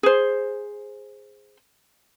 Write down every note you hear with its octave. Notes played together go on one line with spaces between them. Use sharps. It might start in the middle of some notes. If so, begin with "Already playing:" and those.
G#4 C5